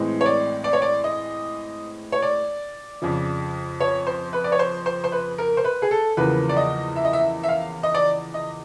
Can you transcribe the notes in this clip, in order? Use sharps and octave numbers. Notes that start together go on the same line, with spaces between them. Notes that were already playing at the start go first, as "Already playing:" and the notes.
Already playing: A2 E3 G#3 C4
C#5
D5
D5
C#5
D5
D#5
C#5
D5
F2 C#3 F3
C#5
C5
B4
D5
C#5
C5
C5
C5
B4
A#4
C5
B4
G#4
A4
E2 C#3 F3 A#3 B4
D5
D#5
E5
D#5
E5
E5
F5
D#5
D5
D#5